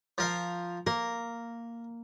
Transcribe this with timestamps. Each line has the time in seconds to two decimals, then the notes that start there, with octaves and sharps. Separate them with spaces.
0.18 F3 A#4 F5
0.87 A#3 A#4